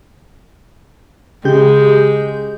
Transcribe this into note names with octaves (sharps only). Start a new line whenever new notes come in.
C#3 G#3 G4 G6